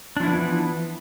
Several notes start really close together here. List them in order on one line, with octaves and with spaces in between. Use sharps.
D4 F3 E4 B3 E3